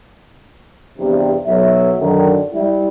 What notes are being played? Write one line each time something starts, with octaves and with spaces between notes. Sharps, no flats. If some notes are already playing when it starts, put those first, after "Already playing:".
E2 G2 C3
B1 F#3 E5
F#2 D3 D#3
G3 E4